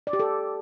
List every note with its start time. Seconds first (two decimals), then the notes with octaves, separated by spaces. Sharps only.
0.07 D5
0.13 G4
0.19 A4